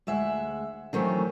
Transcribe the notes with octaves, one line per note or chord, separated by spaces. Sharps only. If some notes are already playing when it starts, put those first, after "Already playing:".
D2 G#3 E5 F#5
D#3 E3 F#3 A3 C4 C#4